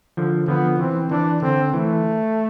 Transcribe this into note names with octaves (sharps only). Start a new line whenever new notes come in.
D3 F3
D3 F3 B3
E3 C4
E3 D4
D3 C4
E3 A3